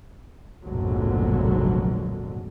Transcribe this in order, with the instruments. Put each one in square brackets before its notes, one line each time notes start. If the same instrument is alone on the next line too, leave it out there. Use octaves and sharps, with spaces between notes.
[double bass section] F1 A#1 G#2 B2 D3 F#3